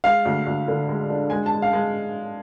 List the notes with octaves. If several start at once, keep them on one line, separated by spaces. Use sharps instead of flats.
G#3 F5
D2
D2
D3
G#3
D4
G#3 G#5
A5
G#3
F5
G#3